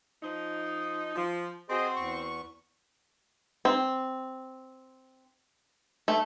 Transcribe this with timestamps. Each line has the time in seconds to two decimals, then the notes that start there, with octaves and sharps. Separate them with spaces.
0.23 F3 D#4
1.16 F3
1.70 C4 F#4 G#4 C5 D#5
1.96 E2 C#6
3.65 C4
6.08 A3